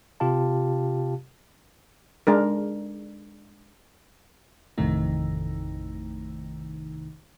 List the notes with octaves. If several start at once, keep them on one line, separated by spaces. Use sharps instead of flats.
C3 F4 G4 F5 A5
G#3 D4 A#4
A1 F2 C3 D#3 A3 D#4